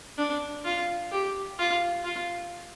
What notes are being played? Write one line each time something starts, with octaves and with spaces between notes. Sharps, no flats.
D4
F4
G4
F4
F4